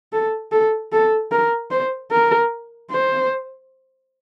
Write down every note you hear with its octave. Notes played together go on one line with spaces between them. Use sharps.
A4
A4
A4
A#4
C5
A#4
C5